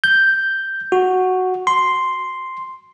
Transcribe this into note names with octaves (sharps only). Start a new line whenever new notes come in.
G6
F#4
C6